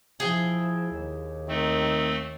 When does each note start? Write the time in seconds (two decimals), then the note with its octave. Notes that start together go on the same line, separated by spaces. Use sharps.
0.20 F3 E4 G#4 G5
0.92 D#2
1.48 D#3 A3 C4